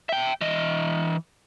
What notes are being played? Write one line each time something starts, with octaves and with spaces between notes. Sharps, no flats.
E5 G5
E3 D#5